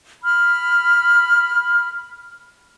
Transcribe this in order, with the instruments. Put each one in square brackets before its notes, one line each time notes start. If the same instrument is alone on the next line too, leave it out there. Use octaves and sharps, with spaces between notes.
[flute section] B5 F6